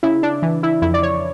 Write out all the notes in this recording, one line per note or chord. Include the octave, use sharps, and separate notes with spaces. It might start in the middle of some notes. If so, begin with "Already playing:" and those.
C#3 E4
D4
E3
E4
F2 E4
D5
C#5